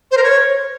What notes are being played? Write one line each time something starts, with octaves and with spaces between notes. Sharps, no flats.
C5
A#4
C#5